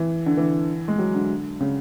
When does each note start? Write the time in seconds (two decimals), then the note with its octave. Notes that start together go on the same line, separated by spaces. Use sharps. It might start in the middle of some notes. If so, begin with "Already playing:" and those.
Already playing: E3
0.26 D3
0.37 E3
0.88 G#3
0.98 F#3
1.14 D3
1.60 C#3